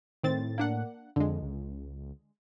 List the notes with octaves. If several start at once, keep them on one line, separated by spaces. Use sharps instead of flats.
A2 D#3 C4 A6
A#3 D4 F#5
F2 D3 G#3
C#2